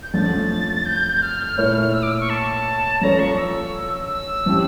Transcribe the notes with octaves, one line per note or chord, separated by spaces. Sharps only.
G6
F2 D3 F3 A3 C#4 A6
G6
F6
A#2 A3 E4 A#4 C#5
E6
D6
E6
C#6
A5
F3 C#4 F4 A4 C#5 A#5
C#6
E6
E6
F3 C#4 E4 G4